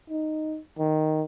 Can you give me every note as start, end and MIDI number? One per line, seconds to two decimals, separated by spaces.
0.10 0.59 63
0.78 1.24 51